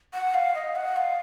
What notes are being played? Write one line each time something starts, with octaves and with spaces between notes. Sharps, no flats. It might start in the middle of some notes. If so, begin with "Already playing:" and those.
F#5
F5
D#5
F#5
F5